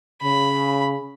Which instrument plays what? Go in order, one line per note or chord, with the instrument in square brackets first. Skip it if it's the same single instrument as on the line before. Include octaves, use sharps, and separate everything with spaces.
[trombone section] C#3 [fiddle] B5